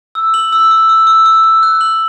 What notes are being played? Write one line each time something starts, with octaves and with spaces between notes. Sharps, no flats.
E6
F#7
E6
E6
E6
E6
E6
E6
F#6
F#7